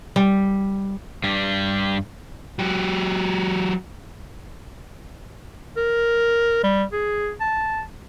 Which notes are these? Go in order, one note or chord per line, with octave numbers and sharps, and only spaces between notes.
G3
G2 G3
F#3 G4
A#4
G3
G#4
A5